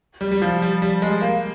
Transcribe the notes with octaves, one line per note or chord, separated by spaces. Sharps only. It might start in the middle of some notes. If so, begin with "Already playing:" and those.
G3
G3
F3
G3
G3
G#3
A#3